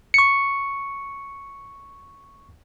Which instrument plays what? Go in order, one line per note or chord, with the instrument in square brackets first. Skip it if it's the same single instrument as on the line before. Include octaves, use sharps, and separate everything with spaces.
[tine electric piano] C#6 C#7